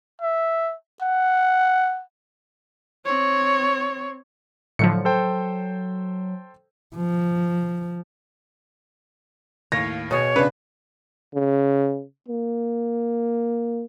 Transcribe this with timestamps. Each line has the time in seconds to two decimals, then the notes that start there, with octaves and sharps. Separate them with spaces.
0.22 E5
1.02 F#5
3.05 C4 C#5
4.79 A2 D3 F3 F#3 C#7
5.05 A4 C5 G5
6.96 F3
9.72 D#2 A2 C#5 F5 A#6
10.11 B2 G#4 C#5
10.36 C#3 D4 B4
11.34 C#3
12.29 A#3